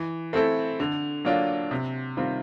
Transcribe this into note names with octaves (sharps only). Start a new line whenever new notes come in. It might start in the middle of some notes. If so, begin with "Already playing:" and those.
Already playing: E3
A3 C4 E4 A4
D3
F#3 A#3 D4 F4
C3
D#3 G3 C4 F4